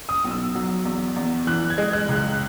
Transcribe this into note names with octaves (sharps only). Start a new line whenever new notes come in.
D#6
B1
E6
F#3
E2
E2
E3 F#6
G#6
G#3
F#6
C#2
F#6